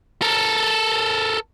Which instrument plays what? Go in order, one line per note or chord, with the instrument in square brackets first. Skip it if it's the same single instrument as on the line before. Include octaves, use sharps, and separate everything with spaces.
[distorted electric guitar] A4 A#4